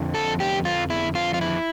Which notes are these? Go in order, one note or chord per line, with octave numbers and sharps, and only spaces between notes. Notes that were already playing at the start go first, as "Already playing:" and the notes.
Already playing: F2 D3 F3
A4
G4
F4
E4
F4
F4
E4